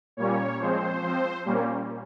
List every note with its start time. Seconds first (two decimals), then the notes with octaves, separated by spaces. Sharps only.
0.17 A#2 G3 A#3 C#4 C#5
0.59 F3 G#3 C4 C5
1.02 F3 C4
1.45 A#2 G3 A#3 C#4